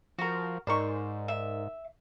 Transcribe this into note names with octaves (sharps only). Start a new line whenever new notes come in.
F3 F#4 A#4
G#2 D#4 A#4 C5 D5 C#6
E5